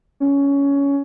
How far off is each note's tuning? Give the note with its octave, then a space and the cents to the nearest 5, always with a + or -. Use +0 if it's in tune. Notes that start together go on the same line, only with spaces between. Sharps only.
C#4 +15